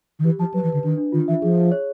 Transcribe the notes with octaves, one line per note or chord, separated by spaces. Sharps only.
D#3
E3 G4
F3 A5
F#3 B4
E3
D3 B4
D#3 D4
D4
D#3 F4
E3 E5
F3 G#4
G#4
C#5